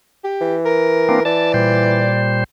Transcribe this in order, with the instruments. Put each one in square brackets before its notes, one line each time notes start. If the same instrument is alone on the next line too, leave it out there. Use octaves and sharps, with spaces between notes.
[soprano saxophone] G4
[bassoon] E3
[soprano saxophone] A#4
[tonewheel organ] A#3 C4 D4
[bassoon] E3 [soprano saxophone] D5 [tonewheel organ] A5
[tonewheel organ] A#2 G3 C5